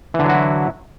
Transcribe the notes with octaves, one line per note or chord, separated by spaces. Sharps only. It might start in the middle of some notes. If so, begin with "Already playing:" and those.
D3 E3 F#3 E4 F#4